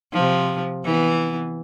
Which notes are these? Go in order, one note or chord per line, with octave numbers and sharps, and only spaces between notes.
C3 F3
E3 B3